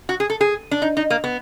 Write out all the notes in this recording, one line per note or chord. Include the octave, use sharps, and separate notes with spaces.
F#4
G#4
A4
G#4
D4
D#4
D#4
A#3
B3